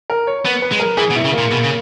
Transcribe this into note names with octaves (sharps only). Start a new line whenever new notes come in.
A#4
C#5
B3 B4
B4
G#3
A#4
E3 G#4
B2
E4
C#3
A#3
A#2
B2
C#3